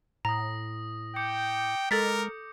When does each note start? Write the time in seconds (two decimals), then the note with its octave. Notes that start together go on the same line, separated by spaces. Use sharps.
0.25 A2 A#5 D#6 A#6
1.16 G5 D6 G6 C#7
1.91 G#3 A4 A#4 A6 B6